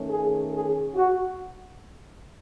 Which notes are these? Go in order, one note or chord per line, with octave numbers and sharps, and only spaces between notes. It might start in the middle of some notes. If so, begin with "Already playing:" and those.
Already playing: D#3 A3 C#4
G#4
G#4
F#4